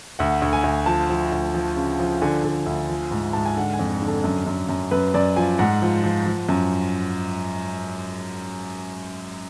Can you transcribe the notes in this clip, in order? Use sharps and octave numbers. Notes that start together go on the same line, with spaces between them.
D2 F#5
D2
G#5
D2
F3 A5
F3
D2
F3
C#3
F3
D3 G#5
D3
D2
F3
G#2
G#2 A5
G#5
D3 F#5
G#5
F2
D3
A4
F#2
F#2
F#2
F#2 B4
F#2 D5
F3 G#5
G#2 F#5
F3
F3
F3
F#2